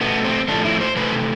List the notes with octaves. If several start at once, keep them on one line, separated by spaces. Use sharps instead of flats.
B2 A3 B3
C4
A2 F3 A3 D4
E4
C5
C3 E3 A3 B4